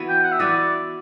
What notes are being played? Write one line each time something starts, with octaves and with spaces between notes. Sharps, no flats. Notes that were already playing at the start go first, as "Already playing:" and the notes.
Already playing: E3 B3 F#4
G5
F#5
E5
E3 B3 F#4 D5